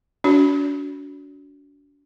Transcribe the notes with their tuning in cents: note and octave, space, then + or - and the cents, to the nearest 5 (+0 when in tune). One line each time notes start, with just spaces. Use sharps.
D4 -40 F#4 +0 D5 -40